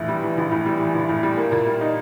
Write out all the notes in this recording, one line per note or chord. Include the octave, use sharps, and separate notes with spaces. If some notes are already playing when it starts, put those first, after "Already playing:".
Already playing: A#1 A2 E3
G3
E3
A#1
A2
G3
E3
A#1
A2
G3
A#3
A#2
G3
D#4